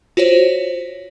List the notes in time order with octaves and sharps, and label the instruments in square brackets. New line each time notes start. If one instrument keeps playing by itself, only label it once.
[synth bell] F4 F#4 C5 C#5